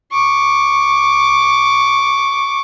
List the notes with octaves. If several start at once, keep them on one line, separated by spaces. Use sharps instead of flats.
C#6 D6